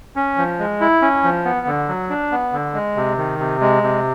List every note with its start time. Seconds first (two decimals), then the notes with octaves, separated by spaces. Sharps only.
0.16 C#4
0.37 F3
0.59 G#3
0.81 E4
1.02 C#4
1.24 F3
1.45 B3
1.67 D3
1.88 F#3
2.10 D4
2.32 B3
2.53 D3
2.74 G#3
2.96 C3
3.17 D#3
3.40 C3
3.61 G#3
3.83 C3